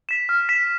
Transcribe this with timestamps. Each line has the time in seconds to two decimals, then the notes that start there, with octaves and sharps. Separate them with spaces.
0.09 B6 E7
0.29 F6
0.49 B6 E7